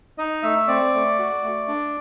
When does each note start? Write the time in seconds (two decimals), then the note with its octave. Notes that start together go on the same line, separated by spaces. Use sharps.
0.18 D#4 D#5
0.43 A3 E5
0.68 C4 D5
0.94 A3
1.19 F#4
1.44 A3
1.68 D4